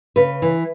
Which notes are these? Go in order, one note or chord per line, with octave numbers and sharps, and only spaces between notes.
C#3 B4
E3